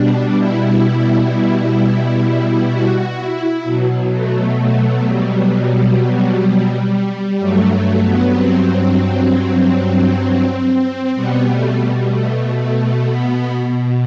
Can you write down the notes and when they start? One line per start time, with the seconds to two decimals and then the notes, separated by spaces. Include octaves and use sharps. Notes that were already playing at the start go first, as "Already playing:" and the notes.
Already playing: B2 G3 D4
0.35 E4
2.70 F#4
3.17 E4
3.64 B2 F#3
4.11 A3
4.57 A3
5.05 G3
7.39 G2 F#3 A3
7.70 A3
8.02 B3
8.33 C4
8.80 C4
11.14 B2 G3 B3
11.46 A3
11.78 G3
12.09 A3
12.56 A3
13.03 B3